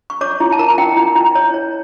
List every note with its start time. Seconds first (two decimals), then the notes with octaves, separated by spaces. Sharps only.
0.10 C#6
0.21 C#5 D6
0.40 E4
0.52 A5
0.59 A#4 A#5
0.78 E4 G5
0.97 E4
1.16 E4
1.35 C#5
1.54 C#5